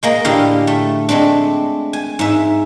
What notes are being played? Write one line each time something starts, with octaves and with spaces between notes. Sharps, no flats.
G#3 A#3 D#5
A2 D3 G4 F5
A3
G#3 A3 C4 D4
G#5
G#2 E5